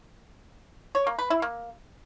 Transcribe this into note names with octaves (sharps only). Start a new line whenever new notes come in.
C#5
A#3
B4
E4
A#3